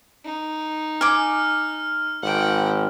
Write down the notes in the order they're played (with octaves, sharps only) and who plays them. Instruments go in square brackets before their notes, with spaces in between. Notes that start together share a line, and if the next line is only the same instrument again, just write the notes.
[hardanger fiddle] D#4
[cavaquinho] G#5 D6 [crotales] F6
[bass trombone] G#1 [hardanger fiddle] F#5 G5